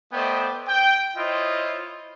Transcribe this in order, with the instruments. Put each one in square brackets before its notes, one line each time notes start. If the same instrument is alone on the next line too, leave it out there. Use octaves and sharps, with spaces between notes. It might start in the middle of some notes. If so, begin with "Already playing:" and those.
[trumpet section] A3 B3 C5 D5 D#5 G5
G5
E4 F4 C5 C#5 D#5